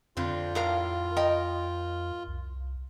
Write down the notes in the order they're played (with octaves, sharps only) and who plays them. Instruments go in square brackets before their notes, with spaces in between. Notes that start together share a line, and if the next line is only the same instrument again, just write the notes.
[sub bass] F2 [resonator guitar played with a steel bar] D3 C4 [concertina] F4
[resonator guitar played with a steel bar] A2 A#4 F5
A#4 D#5 G5
[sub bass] C2